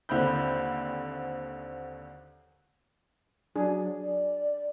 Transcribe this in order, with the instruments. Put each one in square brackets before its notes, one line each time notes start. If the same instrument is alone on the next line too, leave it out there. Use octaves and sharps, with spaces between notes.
[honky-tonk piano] D#2 D3 C4 E4 B5 G6
[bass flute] F#3 [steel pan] D4 G#4
[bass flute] D5